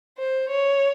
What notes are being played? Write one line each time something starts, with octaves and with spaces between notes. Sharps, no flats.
C5
C#5